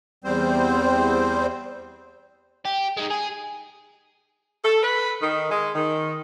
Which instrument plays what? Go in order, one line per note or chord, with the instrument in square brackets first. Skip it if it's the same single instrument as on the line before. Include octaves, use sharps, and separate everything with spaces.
[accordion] E2 G3 C4 C5
[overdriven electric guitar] G4
G#3 D#4
G#4
[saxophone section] A4
B4
D#3
G#3
D#3